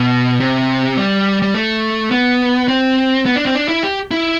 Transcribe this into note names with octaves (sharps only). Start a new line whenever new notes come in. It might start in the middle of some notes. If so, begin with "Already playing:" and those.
Already playing: B2
C3
G3
G3
A3
B3
C4
B3
D4
C4
D4
E4
G4
E4